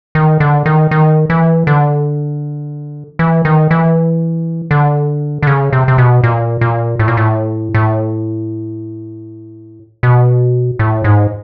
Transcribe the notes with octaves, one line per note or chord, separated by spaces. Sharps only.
D#3
D3
D#3
D#3
E3
D3
E3
D#3
E3
D3
D3
C#3
C3
C3
B2
A#2
A#2
A2
A#2
A2
A2
B2
A2
G#2